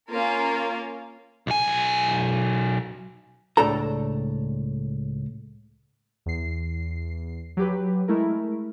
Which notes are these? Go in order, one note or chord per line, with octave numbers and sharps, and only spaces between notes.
A#3 C#4 F4 A#4
B1 G#5
C#2 A2 D4 A4 A#5
E2 C7
F#3 G4 B4
G#3 A3 E4 A#4